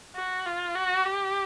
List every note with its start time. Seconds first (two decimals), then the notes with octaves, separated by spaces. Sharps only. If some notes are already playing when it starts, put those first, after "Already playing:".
0.16 F#4
0.45 F4
0.75 F#4
1.05 G4